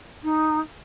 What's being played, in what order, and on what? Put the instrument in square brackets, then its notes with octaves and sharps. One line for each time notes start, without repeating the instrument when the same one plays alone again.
[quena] D#4